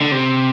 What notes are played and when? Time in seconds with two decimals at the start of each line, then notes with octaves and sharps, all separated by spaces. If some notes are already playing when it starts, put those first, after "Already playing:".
0.01 D3
0.12 C3